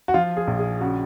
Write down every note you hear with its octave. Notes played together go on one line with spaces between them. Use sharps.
F#4
F3 F4
G#4
A#1
G#4
C#3 F#4